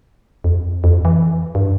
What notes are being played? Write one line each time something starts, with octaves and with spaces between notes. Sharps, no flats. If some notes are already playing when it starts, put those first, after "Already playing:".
F2
F2
E3
G2